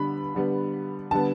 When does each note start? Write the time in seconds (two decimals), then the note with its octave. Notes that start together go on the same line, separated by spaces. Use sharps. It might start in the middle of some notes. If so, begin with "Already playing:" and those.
Already playing: D3 G3 B3 B5
0.35 D3 G3 B3
1.11 D3 G3 B3 A5